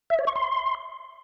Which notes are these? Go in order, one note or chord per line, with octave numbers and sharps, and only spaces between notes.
E5
C#5
C#6
C6